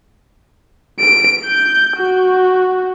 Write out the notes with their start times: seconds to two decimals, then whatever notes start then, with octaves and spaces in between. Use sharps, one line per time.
0.99 D7
1.46 G6
1.97 F#4